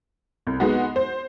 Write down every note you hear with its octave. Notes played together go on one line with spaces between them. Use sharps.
C2
G#3 B3 D#4 F#4
C5